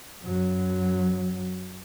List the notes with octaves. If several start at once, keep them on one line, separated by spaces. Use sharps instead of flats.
F#2 F#3